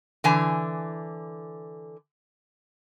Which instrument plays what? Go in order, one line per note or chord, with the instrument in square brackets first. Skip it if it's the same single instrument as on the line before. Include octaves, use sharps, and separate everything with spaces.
[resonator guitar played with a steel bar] D3 E3 G#5